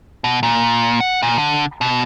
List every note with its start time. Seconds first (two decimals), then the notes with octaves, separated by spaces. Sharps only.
0.24 B2
0.43 A#2
1.00 F#5
1.22 A#2
1.38 D3
1.81 B2